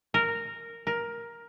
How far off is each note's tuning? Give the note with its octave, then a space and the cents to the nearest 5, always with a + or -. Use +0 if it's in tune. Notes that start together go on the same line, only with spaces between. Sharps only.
A#4 -10
A#4 +10